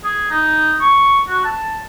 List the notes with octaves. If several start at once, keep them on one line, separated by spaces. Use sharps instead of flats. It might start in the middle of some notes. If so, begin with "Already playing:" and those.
G#4
D#4
C#6
F#4
A5